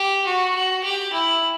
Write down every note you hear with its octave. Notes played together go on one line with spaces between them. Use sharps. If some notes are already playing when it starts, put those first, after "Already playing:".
Already playing: G4
F#4
F#4
G4
E4